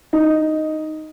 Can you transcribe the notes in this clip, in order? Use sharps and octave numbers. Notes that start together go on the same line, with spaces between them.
D#4